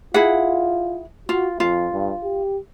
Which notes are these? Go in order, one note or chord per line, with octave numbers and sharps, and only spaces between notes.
E4 F4 G#4 F#5
F4 F#4
F2 F4
G2
G4